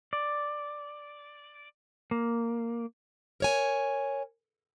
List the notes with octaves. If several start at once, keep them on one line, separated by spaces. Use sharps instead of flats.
D5
A#3
A#4 C#5 G#5